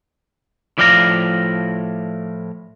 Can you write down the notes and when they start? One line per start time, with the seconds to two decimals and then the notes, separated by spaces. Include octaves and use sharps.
0.78 A2 F3 D5 F5 F#5 A#5